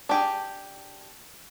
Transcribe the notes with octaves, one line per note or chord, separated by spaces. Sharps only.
D4 G4 G#4